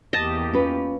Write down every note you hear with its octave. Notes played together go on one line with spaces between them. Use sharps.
E2 A#3 G4 D#5 A5
C#4 F4 B4